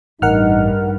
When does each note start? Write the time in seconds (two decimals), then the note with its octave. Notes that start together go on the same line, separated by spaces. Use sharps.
0.22 A1 G2 D#4 A#4 F#5 F6